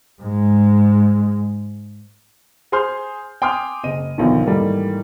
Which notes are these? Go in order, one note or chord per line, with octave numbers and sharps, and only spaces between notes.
G#2 G#3
G#4 C5 G#5 C6 F6 G6
G5 G#5 C6 D6 D#6 F6
F#1 D#5 D#7
B1 E2 D3 D#3 F3
G#2 D#3 E3 G3 A3 A#3